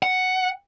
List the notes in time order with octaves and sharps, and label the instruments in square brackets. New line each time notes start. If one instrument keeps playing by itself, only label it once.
[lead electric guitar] F#5